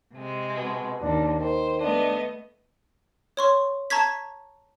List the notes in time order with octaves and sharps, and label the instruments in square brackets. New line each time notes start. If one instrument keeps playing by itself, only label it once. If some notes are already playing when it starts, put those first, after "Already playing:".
[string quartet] C3 G#3
[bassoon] B2
[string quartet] D#2 [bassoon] D4
[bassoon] D#3 [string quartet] C5
[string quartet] A3 B3 D#5 [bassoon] D4
[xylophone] C#5 C6 C#6
A5 A#5 C#6 G#6 B6